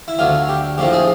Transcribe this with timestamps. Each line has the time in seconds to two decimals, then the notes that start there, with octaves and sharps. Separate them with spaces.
0.08 E4
0.19 D2 D3 F#3 F4
0.48 G4
0.78 A#1 A2 F3 G4
0.93 G#4